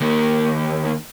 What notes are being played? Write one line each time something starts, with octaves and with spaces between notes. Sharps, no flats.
D#2 A#3